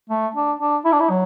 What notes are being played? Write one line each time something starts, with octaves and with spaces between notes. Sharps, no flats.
A3
D4
D4
E4
D4
E4
F#3